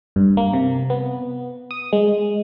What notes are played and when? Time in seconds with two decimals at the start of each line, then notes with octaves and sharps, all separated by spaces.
0.16 G2
0.37 A#3
0.53 C3
0.90 B3
1.71 D#6
1.93 G#3